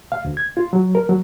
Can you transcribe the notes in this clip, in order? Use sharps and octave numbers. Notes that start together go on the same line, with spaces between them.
F5
D2
G#6
F4
F#3
A#4
F#3